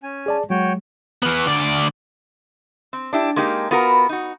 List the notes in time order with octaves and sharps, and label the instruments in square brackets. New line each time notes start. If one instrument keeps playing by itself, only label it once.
[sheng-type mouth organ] C#4 G#5
[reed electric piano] G#4 D5 A5
[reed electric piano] F#3 G#3 [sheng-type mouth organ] F#4 C#5 G5
[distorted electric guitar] E3 B3
D2 D5
[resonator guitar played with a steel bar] C4
D4 E4 G4
G#3 A#3 D#4 G4
B3 F4 F#4 A#4 B4
D#4 F#4